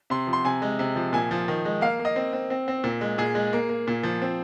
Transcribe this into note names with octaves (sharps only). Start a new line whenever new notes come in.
C3 C6
F3
C6
C3 G#5
G#3
C3
F3
A#2 G#5
F3
D#3
G#3
A#3 F5
A#3
D#5
C4
C4
C4
C4
A#2
G#3
A#2 G#4
G#3
A#3
A#3
A#2
F3
C4